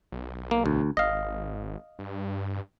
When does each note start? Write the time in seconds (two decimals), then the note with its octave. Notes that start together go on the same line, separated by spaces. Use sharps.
0.12 B1
0.51 A#3
0.66 D2
0.97 G#1 D#5 F5
1.99 G2